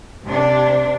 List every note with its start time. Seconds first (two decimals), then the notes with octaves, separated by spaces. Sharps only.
0.24 C3 D4